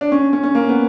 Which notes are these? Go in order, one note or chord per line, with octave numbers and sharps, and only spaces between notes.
D4
C#4
C#4
C#4
A#3
B3